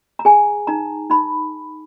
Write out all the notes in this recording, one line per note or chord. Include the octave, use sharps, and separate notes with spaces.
A#5
G#4 G#5
D#4 A#5
D#4 B5